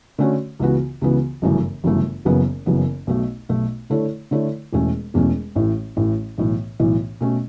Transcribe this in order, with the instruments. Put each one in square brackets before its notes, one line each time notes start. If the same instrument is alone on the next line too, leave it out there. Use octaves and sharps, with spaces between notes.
[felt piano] D3 A3 C#4 F#4 C#5
C#2 C#3 E3 B3 F#4
C#2 C#3 E3 B3 F#4
G1 F#2 C#3 E3 A3
G1 F#2 C#3 E3 A3
F#1 F#2 C#3 E3 B3
F#1 F#2 C#3 E3 B3
B1 B2 A3
B1 B2 A3
D3 A3 E4 A4 C#5
D3 A3 E4 A4 C#5
E1 E2 B2 A3 C#4
E1 E2 B2 A3 C#4
A1 A2 E3
A1 A2 E3
B1 A2 E3
B1 A2 E3
B2 A3 C#4